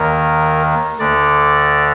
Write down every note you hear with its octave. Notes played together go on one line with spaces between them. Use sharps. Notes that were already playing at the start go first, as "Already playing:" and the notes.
Already playing: D#2 D#3 A#4
D2 D3 D5